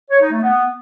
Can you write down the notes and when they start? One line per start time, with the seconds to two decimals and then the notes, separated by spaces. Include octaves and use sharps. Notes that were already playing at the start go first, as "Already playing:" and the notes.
0.10 C#5
0.21 D#4
0.32 A3
0.42 B3